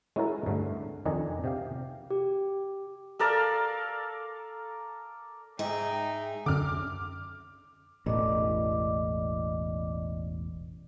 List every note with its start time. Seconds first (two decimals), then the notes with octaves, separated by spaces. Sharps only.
0.16 G#3 C#4 E4 F#4 A4 A#4
0.46 G2 D3 A3
1.05 F2 D#3 D4 D#5 G#5
1.44 C3 G4 F5
2.10 G4
3.19 A4 A#4 D5 F5
5.59 G#2 D#4 G#4 E5 G5
6.46 F#2 D3 D6 F6
8.06 E1 A1 D5 D#5 D6